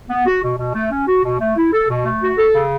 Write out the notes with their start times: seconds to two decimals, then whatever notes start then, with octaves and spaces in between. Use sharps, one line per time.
0.10 B3
0.26 F#4
0.43 B2
0.58 B2
0.75 A3
0.92 C#4
1.08 F#4
1.24 B2
1.40 A3
1.57 E4
1.73 A4
1.89 B2
2.05 A3
2.22 F#4
2.38 A4
2.54 C#3